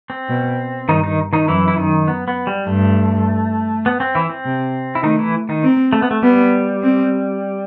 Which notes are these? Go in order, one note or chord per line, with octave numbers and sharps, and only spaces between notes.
C4
B2
G2 D#3 D#4
D#3 D#4
D#3 D#4
F#2 E3 E4
E4
D#3 D#4
B3
B3
G3
G2 A3
B3
C4
E3 E4
C4
C3
E4
D#3 A3 D#4
E3 E4
D#3 D#4
C4
A3
B3
A3
G3 B3
C4